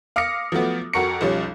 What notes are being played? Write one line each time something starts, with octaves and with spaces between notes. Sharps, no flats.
F5 D6 D#6 F6 A#6 C#7
F3 F#3 A3 B3
F2 F#4 A#4 C#6 C#7
B1 F3 G3 C#4